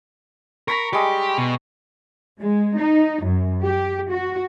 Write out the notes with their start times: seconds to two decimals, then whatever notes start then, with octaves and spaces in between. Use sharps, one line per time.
0.68 A#4 A#5 B5 C#6
0.93 G3 G#3 G4
1.38 B2
2.40 G#3
2.77 D#4
3.23 F#2
3.63 G4
4.11 F#4